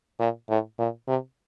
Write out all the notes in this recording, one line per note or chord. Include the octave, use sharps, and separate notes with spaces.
A#2
A2
A#2
C3